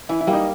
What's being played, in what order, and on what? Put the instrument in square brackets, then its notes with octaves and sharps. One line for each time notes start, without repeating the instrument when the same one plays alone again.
[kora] E3 [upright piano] E4
[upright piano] E4
[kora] G3 A#3
[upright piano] D#4